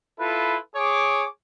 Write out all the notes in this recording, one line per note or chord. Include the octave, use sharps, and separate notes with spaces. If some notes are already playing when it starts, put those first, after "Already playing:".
E4 F4 A4 B4
G#4 C#5 D6